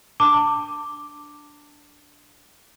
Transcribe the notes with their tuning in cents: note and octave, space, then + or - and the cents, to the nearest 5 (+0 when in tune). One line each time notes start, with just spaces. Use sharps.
D4 +0 A5 +30 D6 +0